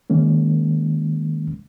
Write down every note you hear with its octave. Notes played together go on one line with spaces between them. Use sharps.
D#3 G#3 A#3 C#4